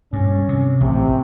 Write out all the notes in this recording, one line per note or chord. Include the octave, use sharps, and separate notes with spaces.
G2 C#4
C3
A1 C3